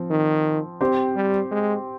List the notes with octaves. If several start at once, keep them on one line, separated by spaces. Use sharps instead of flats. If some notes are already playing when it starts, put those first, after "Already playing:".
Already playing: F3 C4
D#3
C4 G4 C5
G3
G#3